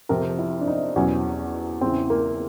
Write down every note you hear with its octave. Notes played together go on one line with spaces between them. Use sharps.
F2 C3 F3 A#4
E4
D4
D#4
E2 B2 F#3 C#4
E2 C#3 E3 C4
A#3